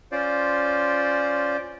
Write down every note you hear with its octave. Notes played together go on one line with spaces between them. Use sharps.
C#4 F4 C5 D5